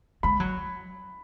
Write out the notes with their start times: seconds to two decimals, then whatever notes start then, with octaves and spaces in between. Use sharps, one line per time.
0.23 G#3 B5
0.40 F#3